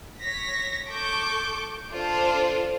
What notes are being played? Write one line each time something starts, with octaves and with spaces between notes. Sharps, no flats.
C#5 A#6 B6
A4 C#6 D6 G6
D4 F4 A4 C5